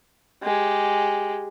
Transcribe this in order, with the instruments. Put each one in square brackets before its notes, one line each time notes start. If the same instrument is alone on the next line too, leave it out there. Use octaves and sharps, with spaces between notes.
[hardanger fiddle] G#3 G4